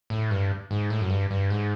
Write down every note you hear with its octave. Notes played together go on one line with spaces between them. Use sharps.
A2
G2
G#2
A2
F#2
G2
G2
G#2